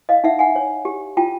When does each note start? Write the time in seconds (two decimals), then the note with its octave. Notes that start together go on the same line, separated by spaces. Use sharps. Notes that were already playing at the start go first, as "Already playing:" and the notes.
0.09 D#5 F5
0.24 D#4 E5 F#5
0.39 F#5 G#5
0.56 C#5
0.85 G4
1.17 F4 G5 A5